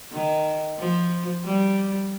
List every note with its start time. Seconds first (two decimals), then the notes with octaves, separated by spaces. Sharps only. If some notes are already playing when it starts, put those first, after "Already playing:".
0.13 D#3
0.79 F3
1.45 G3